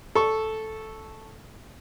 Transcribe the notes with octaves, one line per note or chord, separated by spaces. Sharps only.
A4 C#6